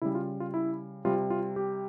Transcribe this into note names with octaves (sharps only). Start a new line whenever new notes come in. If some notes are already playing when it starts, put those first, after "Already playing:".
C#3 G3 E4
F4
F4
E4
C3 G3 F4
F4
G4